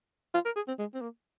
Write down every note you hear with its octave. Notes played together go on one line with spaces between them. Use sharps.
F4
A#4
G#4
C4
G#3
C4
A#3